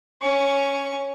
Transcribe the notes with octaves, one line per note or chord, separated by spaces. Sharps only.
C#4 C#6